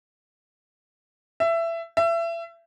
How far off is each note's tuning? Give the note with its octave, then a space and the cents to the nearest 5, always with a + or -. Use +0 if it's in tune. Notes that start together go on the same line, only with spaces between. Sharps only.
E5 +20
E5 +30